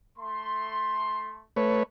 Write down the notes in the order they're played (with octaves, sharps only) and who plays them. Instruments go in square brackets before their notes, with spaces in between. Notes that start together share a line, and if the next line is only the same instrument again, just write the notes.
[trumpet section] A3 C6
[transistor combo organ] A3 B4 C#5